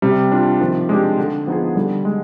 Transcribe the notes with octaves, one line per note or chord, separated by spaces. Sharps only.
C3 G3
D4 F4
D#3 F3
G#3 D4 G4
D3
F3 B3 D#4 G#4
D3 G3
G#3